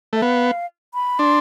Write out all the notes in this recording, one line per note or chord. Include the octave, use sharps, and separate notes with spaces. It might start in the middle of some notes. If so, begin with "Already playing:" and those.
A3 E5
B3 F5
B5
D4 C6